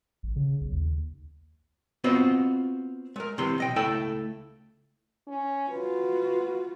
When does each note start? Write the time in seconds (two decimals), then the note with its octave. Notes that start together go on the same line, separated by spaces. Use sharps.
0.23 A1
0.36 C#3
0.61 B1
0.73 D#2
2.04 B3 C4 F4 F#4 C5 D#5
3.16 G#3 A#4
3.38 C3 E3 C6
3.58 B1 D#5 G5
3.76 C#2 A3 E4 A4 G5
5.27 C#4
5.70 F4 F#4 B4